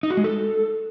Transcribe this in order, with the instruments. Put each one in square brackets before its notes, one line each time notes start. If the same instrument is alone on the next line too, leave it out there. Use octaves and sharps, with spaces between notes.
[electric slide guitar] D#4
F#4
G#3
A4